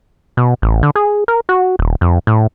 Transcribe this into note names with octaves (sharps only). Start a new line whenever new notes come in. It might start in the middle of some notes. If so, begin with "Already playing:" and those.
B2
A1
D3
G#4
A#4
F#4
D#1
F2
A2